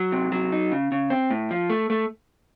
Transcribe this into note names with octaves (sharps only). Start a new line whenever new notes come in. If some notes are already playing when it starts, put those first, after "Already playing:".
Already playing: F#3
C3
F#3
D#4
C#3
C#3
C4
A2
F3
A3
A3